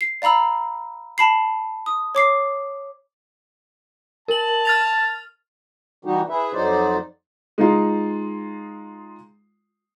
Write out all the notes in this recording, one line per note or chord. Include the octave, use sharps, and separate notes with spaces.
C7
D5 F5 A#5 B5 E6
A5 B5 C7
D#6
C#5 D6 C7
A#4 A5 F#7
F6 A6 F7
E3 G3 D#4 F#4 G4
E4 G#4 B4 E5
F2 F#3 D#4 C5 D5
G#3 D#4 F4